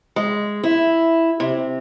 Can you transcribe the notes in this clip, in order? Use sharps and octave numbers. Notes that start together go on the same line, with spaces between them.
G#3
E4
C3